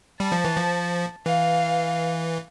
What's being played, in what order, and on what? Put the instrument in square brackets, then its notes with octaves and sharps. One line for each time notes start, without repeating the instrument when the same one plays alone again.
[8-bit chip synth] G3 [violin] A5
[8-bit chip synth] F3
E3
F3
[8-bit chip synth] E3 [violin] F5